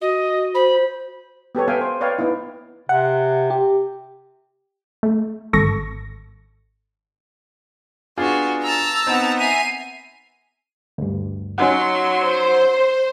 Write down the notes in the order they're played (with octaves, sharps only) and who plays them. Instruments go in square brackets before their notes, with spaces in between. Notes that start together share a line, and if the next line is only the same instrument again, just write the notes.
[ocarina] F#4 [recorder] D#5
[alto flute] C5 [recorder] B5
[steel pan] B3 G4 A4 C#5
B3 E5 F5 G5 G#5
C5
B4 C#5 D5 F5 G5
B3 D#4 E4
[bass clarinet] C3 [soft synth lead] F#5
[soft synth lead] G4
[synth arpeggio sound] A3
G#1 A4 C#6 A#6
[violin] B3 F#4 [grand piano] D4 F4 G#4
[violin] A5 A#5 [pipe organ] E6
[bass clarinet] B3 [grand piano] C4 D#4
[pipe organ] E5 G#5 A#5 [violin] C7 D#7
[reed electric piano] D2 G2
[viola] F#3 C6 [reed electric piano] C#4 D#4 F#5
[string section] C5